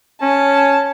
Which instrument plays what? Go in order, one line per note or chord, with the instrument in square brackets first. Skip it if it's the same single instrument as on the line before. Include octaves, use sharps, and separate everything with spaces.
[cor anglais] C#4 [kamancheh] A5